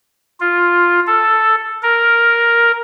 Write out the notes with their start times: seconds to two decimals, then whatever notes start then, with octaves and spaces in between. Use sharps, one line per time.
0.40 F4
1.07 A4
1.83 A#4